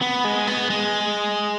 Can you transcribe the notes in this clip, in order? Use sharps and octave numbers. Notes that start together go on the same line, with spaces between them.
B3
G#3
B3
G#3